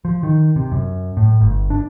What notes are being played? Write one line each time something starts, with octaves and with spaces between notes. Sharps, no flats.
F3
D#3
C3
F#2
A2
G1
D4